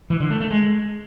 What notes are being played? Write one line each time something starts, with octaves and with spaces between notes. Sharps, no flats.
E3
D3
A3
A3
G#3